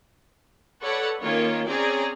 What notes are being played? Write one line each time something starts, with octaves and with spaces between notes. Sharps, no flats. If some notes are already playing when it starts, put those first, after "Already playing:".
A4 B4 C#5 D5 F#5
D#3 A#3 C#4 F4 C#5
C4 C#4 G#4 D5 A#5